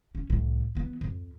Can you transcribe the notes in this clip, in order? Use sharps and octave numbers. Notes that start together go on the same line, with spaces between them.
C#4
C2 A2
E3 B3
F2